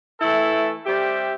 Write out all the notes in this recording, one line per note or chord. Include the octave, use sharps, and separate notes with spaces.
E3 A3 E4 A4
G3 C4 G4 E5